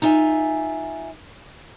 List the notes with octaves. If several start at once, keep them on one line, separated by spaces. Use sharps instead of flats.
D#4 F4 E5 F#5 G#5